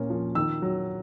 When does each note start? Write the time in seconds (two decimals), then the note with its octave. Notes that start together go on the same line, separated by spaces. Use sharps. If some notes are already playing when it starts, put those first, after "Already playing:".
Already playing: A#2 A#3 C#4
0.10 F3
0.35 D#3 E6
0.62 F#3